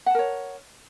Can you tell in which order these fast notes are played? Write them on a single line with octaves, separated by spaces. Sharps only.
F#5 A5 A#4 C#5